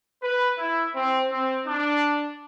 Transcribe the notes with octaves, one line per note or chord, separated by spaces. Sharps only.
B4
E4
C4
C4
D4